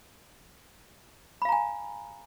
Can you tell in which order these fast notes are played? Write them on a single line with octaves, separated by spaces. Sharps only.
B5 F5 A#5 G#5